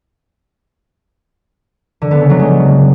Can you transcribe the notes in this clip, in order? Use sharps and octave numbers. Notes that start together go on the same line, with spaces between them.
D3
B3
C#3
F#3
G#3